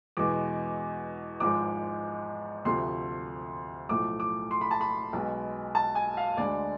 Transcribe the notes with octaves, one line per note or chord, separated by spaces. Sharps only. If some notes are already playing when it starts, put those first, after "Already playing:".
E2 B2 G#3 D6
G#1 G#2 F3 G#3 D6
D2 C3 F3 A3 C6
B1 A2 F3 A3 D6
D6
C6
B5
A5
B5
B1 B2 G#3
A5
G#5
F5
D2 D3 G#3 D5